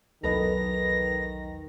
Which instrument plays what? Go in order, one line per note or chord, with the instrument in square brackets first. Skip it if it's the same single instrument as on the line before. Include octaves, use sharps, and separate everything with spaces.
[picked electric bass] B1 E2 F#3 [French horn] D#3 [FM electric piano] A4 B4 D#5 [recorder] A#6